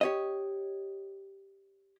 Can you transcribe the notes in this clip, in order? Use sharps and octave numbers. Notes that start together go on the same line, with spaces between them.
G4 C#5 D#5